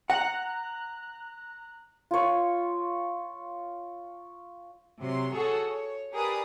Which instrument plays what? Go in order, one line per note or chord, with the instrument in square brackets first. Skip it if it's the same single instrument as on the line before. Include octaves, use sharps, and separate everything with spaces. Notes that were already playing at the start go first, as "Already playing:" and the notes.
[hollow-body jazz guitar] F#5 [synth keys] A#5 F#6
[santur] F4 C#5
[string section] C3 F#3 C6
F#4 G#4 A4 C#5
C#5
G4 G#4 A#4 B4 D5 D#6